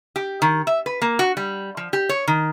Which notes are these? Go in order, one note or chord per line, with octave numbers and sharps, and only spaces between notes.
G4
D#3
E5
B4
A#3
F#4
G3
F3
G4
C#5
D#3